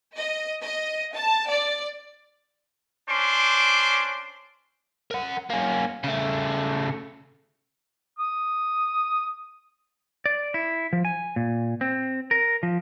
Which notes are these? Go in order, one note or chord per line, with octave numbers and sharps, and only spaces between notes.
D#5
D#5
A5
D5
C#4 D4 C5 C6 D6
A#4 F#5
A#3 C#4
C#3 A3
D#6
D5
E4
F3
G#5
A#2
C4
A#4
F3